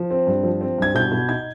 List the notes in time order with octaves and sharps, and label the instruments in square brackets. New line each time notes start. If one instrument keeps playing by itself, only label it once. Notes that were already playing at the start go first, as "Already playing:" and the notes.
Already playing: [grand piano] F3
C4
G2
F3
C4
G2 G#6
B2 G6
B2
D#4 G#6